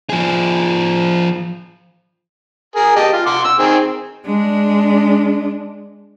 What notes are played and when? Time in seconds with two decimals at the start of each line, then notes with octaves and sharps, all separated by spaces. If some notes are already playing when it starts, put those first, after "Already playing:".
0.10 F3 G#4
2.76 G#4 A#4
2.96 G4 D#5 A5
3.13 F4
3.26 F#5 C6 D6
3.44 E6
3.59 D#3 C4 G#4
4.25 G#3 D4